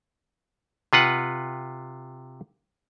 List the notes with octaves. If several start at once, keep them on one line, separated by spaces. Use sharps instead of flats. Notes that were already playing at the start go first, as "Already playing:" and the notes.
C3 F4 B4 F#5